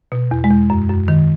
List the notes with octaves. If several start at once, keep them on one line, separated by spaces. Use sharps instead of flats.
B2
E2
G#3
E2
F#2
F#2
D#3